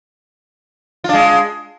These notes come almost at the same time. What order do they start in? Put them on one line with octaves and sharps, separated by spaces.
F4 D4 G#3